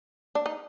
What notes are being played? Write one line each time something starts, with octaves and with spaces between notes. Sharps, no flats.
D4
D#4